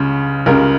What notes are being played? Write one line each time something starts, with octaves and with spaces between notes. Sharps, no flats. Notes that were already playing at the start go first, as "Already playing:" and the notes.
Already playing: C#2 C#3
C#2 C#3 A#4